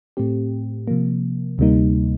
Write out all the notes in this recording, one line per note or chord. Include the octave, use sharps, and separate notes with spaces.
A2 A3 C4 G4
C3 F3 A#3
D2 C3 G3 A#3 D#4